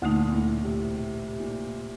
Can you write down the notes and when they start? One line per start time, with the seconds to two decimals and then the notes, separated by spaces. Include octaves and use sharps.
0.02 D2 A#2 D3 A3 D#4
0.32 A2
0.63 C3
0.94 C3
1.40 A#2